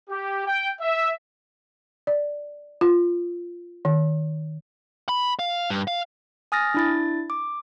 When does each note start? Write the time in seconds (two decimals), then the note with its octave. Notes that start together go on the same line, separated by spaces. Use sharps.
0.10 G4
0.45 G5
0.80 E5
2.07 D5
2.81 F4
3.85 D#3
5.09 B5
5.39 F5
5.70 G2
5.87 F5
6.52 G#5 D#6 F6 A6 A#6
6.74 D4 E4 A6
7.30 D6